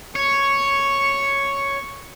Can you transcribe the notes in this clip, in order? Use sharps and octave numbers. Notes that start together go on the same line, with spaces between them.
C#5 C#6